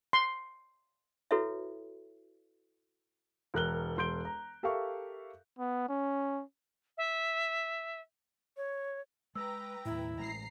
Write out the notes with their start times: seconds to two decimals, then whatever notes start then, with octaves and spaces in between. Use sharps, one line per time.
0.13 C6
1.31 E4 F#4 A4 B4 C#5 E5
3.54 E1 A#4 F#6 G7
3.97 E1 C6 G6 D7 G7
4.25 A#5
4.63 G4 A4 A#4 E5 F5 C#6
5.59 B3
5.89 C#4
6.97 E5
8.57 C#5
9.35 G#3 B4 G5 A#5 E6
9.85 D#2 A2 E4
10.19 A1 G#3 A#5 C7